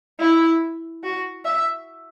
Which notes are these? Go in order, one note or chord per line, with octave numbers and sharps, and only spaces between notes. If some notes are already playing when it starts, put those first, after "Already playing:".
E4
F#4
E5